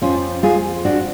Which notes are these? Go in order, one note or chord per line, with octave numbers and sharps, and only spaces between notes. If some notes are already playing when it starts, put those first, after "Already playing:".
F2 F3 C#4 F4
F4 G#4
D4 F#4